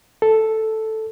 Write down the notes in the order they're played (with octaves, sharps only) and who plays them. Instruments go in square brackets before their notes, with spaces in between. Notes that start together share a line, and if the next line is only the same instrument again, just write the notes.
[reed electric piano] A4